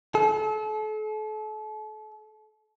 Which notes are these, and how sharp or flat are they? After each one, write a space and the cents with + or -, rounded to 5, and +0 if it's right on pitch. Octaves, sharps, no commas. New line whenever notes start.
A4 -35